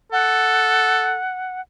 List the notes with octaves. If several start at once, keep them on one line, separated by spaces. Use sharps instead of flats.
A4 F#5